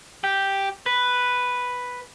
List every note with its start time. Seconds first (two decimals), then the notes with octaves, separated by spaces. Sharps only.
0.24 G4
0.86 B4